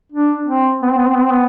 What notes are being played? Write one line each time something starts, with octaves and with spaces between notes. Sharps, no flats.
D4
C4
B3
C4
B3
C4
B3
C4
B3